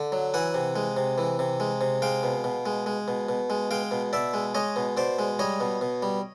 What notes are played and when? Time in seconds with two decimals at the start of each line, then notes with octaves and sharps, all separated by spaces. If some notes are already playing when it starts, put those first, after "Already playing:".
Already playing: D3
0.12 F#3
0.34 E3 F#5 G#5
0.55 C3
0.76 G#3
0.97 C3
1.18 E3
1.39 C3
1.60 G#3
1.81 C3
2.02 G#3 F5 G5
2.23 B2
2.44 B2
2.66 G#3
2.86 G#3
3.08 B2
3.29 B2
3.50 G#3
3.71 G#3 F5 G5
3.91 B2
4.13 B2 D5 E5
4.34 G#3
4.55 G#3 C#5 D#5
4.76 B2
4.97 B2 C5 D5
5.19 G#3
5.39 G3 C#5 D#5
5.60 B2
5.81 B2
6.02 G3